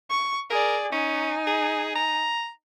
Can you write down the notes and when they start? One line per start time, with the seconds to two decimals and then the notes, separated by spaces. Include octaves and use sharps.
0.10 C#6
0.50 G#4 A#4 D5
0.92 C#4 D#4 G#5
1.47 G#4
1.95 A#5